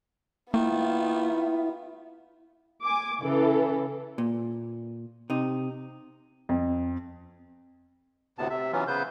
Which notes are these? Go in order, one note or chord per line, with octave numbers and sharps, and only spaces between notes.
D#3 A#3 B3 E4 F4
G#5 D6
C#3 E3 A4
A#2
C3 D#4
F2
D2 A2 C3 B3 A5
C3 E5
E3 F#3 B3 C#4 F4
C#3 B3 B4 C5 G6